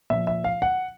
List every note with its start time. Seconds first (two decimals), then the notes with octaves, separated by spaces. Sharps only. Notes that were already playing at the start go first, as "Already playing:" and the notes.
0.10 A#2 F3 E5
0.27 E5
0.44 F5
0.62 F#5